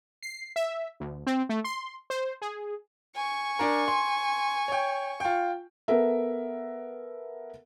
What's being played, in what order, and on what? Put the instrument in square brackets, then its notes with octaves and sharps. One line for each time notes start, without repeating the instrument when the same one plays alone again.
[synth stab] C7
E5
D2
C4
A3
C6
C5
G#4
[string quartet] G#5 C#6
[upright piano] D4 A#4
C6
C#5 G5
F4 G5
[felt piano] B3 A4 A#4 E5